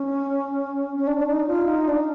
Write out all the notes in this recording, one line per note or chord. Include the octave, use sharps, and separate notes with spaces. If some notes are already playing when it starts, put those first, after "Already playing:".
Already playing: C#4
C#4
D4
D4
D#4
F4
D#4
D4